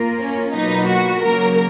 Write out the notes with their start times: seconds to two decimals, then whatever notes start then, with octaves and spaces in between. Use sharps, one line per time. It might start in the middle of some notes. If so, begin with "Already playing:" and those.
Already playing: A#3 F4 A#4
0.18 C#4
0.53 B2 F#3 A#3 D#4 F4 B4
0.87 F#4
1.22 C#3 F#3 A#3 A#4